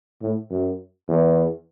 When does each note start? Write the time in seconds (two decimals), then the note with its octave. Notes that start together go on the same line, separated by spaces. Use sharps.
0.22 A2
0.50 F#2
1.08 E2